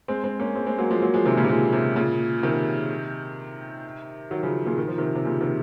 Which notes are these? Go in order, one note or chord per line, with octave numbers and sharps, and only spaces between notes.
G#3 C4
G#3 C4
A#3 C#4
G#3 C4
G#3 C4
F#3 A#3
F3 G#3
F#3 A#3
F3 G#3
C3 D#3
A#2 C#3
C3
A#2 C#3
C3
A#2 C#3
C3 D#3
D#3 F#3
C#3 F3
A#2 C#3
D#3
F3
C3 D#3
C3
A#2 C#3
C3 D#3